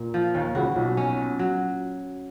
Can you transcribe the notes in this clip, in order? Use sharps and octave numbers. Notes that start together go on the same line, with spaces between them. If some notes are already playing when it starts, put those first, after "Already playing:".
Already playing: A#2
F3
D#2 D#3
C#2 C#3 F#4
B1 B2
C#4
F#3